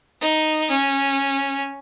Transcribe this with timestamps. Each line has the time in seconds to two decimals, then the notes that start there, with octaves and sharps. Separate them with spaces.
0.21 D#4
0.71 C#4